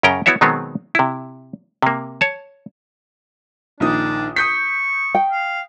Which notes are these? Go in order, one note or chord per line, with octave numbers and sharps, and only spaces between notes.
F#2 C#3 C#4 A#4 G5 A#5
B3 E4 F#4 C#5 E5
B2 D#3 F#3 G#3 B3 C4
C3 E4
C3 A#3
C#5 A5
A#1 D#3 D4 D#6
C#6 D#6 G6 B6
G5
F5